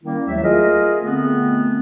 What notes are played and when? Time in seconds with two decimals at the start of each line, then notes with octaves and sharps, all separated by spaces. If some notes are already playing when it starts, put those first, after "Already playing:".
0.04 D#3 G3 A#3 C#4 E4
0.26 D#2 F#3 A3 E5
0.44 F4 G#4 A#4 D#5
1.01 D3 A3 B3 C4